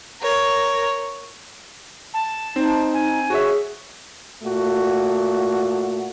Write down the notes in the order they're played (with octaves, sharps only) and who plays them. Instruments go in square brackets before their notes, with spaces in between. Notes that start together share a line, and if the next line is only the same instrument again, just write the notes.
[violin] A#4 C#5
[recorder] A5
[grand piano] C4 [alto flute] D#4
[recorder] G#5
[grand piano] F#4 C#5 E5 [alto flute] G#4
[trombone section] A#2 A3 F#4